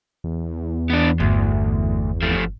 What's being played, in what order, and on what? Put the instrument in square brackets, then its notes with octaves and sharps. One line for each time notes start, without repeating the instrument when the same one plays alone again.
[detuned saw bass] E2
[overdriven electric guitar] B3 D4
[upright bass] G1 [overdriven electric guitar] D2
[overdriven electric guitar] F3 A3